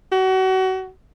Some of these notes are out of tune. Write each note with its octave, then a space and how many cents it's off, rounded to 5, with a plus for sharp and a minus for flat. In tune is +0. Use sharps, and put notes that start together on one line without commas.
F#4 +30